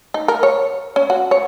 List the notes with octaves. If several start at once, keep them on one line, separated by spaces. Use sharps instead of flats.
D#4
A#4
C#5
C#4
F#4
C#5